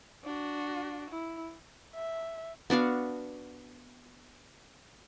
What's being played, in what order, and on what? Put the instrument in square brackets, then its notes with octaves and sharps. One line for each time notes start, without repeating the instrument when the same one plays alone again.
[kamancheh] D4 F#4
E4
[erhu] E5
[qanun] B3 D4 F#4 F5